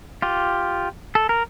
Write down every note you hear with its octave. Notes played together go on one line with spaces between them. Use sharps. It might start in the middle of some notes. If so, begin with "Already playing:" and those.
F4 G4
A4
A#4